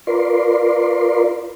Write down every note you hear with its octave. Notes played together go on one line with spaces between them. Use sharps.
F4 A#4 B4 D5 C6